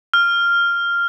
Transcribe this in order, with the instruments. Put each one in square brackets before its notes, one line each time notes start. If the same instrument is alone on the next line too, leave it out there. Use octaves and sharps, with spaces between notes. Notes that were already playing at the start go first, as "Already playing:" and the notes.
[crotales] F6